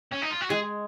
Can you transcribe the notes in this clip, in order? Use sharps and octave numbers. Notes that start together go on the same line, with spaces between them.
C#4
D#4
F4
F#4
G#3 G#4